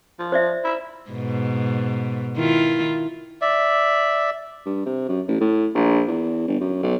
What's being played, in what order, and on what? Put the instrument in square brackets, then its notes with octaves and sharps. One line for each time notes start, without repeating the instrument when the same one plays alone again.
[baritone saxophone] F3
[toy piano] C5 D5 E5
[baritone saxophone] E4
[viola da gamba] G#2 B2
D#3 E4 F4
[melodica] D5 E5
[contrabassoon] G2
C3
F#2
A1
A2
A#1
E2
G1
F#2
B1